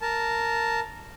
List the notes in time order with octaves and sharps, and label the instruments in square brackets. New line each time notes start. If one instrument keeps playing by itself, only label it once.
[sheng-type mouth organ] A#4 A5